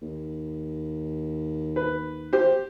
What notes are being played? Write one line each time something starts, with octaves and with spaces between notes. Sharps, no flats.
D#2
B4
G4 C5